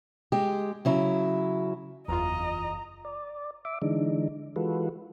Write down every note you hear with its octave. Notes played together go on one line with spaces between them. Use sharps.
G#3 G4
C#3 F#3 E4
F#1 E2 F4 D#5 A#5
D5
E5 D6
D3 E3 G#3 D4 D#4
E3 G#3 F4 F#4 A4 B4